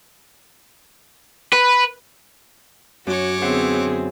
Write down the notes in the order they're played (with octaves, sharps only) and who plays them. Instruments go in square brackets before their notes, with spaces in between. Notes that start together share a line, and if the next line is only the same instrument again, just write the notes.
[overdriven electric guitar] B4
[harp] F#2 [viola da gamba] F#4 [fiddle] C#5 D6
[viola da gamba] D3 B3 G#4 [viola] C4 [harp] C5 E5 F#5